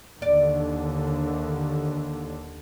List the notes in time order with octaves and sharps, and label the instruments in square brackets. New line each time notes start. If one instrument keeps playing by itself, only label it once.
[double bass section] D#2 D3 [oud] D5